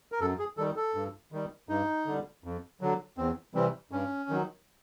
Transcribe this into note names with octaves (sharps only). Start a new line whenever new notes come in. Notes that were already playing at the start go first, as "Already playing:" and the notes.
A#4
F#2 A4
G#4
D#3 G3 A4
A4
G2
D#3 G3
G2 D#4
D3 G3
F2
D3 F#3
E2 C4
C3 E3 G3 C4
G2 C#4
D#3 F#3